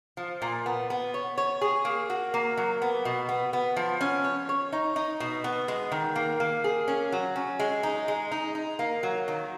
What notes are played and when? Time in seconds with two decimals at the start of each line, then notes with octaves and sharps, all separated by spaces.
0.17 F3
0.42 A#2
0.66 B3
0.90 B3
1.14 C#5
1.38 C#5
1.61 G#4
1.85 A#3
2.10 F#4
2.34 A#3
2.57 F#3
2.82 B3
3.05 B2
3.29 B3
3.53 B3
3.76 F3
4.01 C#4
4.24 C#5
4.49 C#5
4.72 D#4
4.96 D#4
5.20 B2
5.44 B3
5.68 G#3
5.92 D#3
6.16 A#3
6.40 A#3
6.64 G#4
6.88 C#4
7.12 F#3
7.36 C#4
7.59 G#3
7.83 D#4
8.08 G#3
8.32 D#4
8.55 D#4
8.79 A#3
9.03 F#3
9.28 D#3